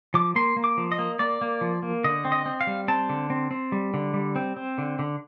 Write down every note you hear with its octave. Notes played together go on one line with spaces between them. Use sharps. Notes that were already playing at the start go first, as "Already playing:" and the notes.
F3 D6
A#3 C6
A#3
D6
F3
D#5
A#3
A#3 D5
A#3
F3
A#3
D3 D#5
C4
D#5
C4
F5
G3
C4 A5
D3
C4
C4
G3
D3
G3
C4
C4
D3
D3